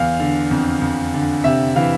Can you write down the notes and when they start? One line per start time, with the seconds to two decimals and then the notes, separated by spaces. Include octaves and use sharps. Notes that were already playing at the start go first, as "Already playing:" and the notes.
Already playing: E2 F5
0.20 D3
0.51 F2
0.82 F2
1.14 D3
1.44 C3 E5
1.76 E3 F5